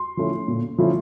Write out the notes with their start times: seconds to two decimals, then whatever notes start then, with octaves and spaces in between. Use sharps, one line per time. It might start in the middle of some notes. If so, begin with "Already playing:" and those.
Already playing: C6
0.17 F3 A3 C#4 E4
0.48 A#2
0.78 F3 A3 C#4 E4